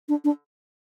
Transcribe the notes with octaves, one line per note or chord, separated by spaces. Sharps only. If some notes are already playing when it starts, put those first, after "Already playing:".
D4
D4